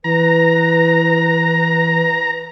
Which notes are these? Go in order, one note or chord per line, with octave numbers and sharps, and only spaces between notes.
E3 B4 A#5